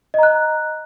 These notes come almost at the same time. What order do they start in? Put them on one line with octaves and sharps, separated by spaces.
D#5 A#5 F#6